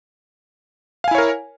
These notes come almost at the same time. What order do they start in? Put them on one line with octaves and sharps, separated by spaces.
F5 G#5 E4 C#5 A#4